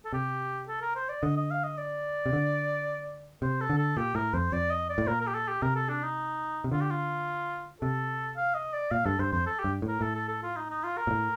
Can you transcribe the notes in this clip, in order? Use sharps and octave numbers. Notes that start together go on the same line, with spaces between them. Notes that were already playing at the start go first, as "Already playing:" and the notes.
A4
C3 G4
A4
A#4
C5
D5
D3 D#5
D#5
F5
D#5
D5
C3
D3
C3 C5
A4
D3
A4
A#2 G4
A2 A#4
F2 C5
F2 D5
D#5
D5
A2
A#2 A#4
A#4
G4
A4
G4
C3 A#4
A4
D4
D#4
C3
D3 F4
G4
F4
C3 A4
F5
D#5
D5
A#2 F5
G2 A4
G2 C5
F2 C5
A4
G4
G2
A2
A#4
A2 A4
A4
A4
F4
D#4
D#4
F4
A#4
A#2
A2